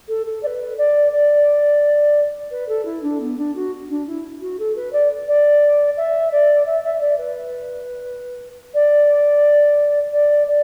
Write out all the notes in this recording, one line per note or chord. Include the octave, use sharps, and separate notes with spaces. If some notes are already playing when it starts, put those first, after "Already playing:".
A4
A4
D5
B4
D5
D5
B4
A4
E4
D4
B3
D4
F#4
D4
E4
F#4
A4
B4
D5
D5
E5
D5
E5
E5
D5
B4
D5
D5
D5